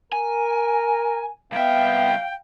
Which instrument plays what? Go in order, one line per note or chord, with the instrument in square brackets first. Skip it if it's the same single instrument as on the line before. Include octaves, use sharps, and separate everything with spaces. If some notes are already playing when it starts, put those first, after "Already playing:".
[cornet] A#4 [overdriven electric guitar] G#5
[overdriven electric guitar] C2 E5 [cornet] B3 [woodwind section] F5 G5